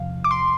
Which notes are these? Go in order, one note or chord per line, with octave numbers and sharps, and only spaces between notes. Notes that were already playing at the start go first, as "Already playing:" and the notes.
Already playing: E2 C3 F3 F5
D6
C6